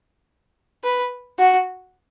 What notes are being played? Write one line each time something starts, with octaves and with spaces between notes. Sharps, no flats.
B4
F#4